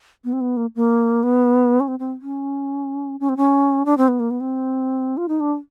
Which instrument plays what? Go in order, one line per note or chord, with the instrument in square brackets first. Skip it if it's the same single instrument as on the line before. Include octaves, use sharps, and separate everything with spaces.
[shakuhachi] B3
C4
B3
A#3
A#3
B3
C#4
C4
C4
C#4
C#4
C4
C#4
D4
C4
B3
A#3
B3
C4
F4
D#4
D4